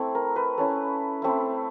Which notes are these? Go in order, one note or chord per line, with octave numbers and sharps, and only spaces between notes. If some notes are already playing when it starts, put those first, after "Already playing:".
Already playing: A3 C4 E4
A#4
B4
A3 C#4 E4
A3 C4 E4